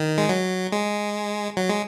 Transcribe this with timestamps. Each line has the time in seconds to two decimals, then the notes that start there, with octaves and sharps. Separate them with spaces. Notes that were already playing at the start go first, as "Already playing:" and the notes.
Already playing: D#3
0.18 G#3
0.29 F#3
0.72 G#3
1.57 F#3
1.69 G#3